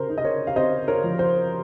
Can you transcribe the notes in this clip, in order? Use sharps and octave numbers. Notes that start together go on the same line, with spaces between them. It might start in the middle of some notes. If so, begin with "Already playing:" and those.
Already playing: C#3 A#4 C5
D#4
D#5
A#4 C#5
F5
C4 C5 D#5
A#4 C#5
F3
C5